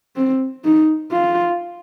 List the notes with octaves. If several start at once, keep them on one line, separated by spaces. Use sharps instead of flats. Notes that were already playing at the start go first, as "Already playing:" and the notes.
C4
D#4
F4